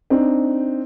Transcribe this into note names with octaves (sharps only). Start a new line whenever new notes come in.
C4 D4 D#4